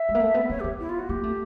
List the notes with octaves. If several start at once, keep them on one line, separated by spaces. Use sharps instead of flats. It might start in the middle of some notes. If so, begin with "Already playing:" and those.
Already playing: E5
G#3
A#3
A3
B3
A#3 C#5
G4
B3
E4
F4
F#4
A#3 G4
A3